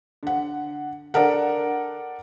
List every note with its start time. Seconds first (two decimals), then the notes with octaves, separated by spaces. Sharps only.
0.23 D3 F#5
1.14 D4 A4 A#4 F#5